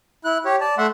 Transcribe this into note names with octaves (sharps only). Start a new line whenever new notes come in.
E4 F#6
G4 C#5
D5 A5
A3 E5 F#5 C6